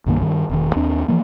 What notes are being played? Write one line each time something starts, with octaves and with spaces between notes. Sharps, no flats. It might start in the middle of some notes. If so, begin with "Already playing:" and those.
C2 G2 D#3 A#3
G2 D#3
E1 D#3
D#2 C4 D4
E3 F3 A#3